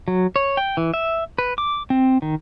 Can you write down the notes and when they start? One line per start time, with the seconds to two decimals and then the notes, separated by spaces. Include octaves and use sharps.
0.08 F#3
0.36 C#5
0.57 G5
0.77 E3
0.94 E5
1.38 B4
1.58 D6
1.90 C4
2.22 D#3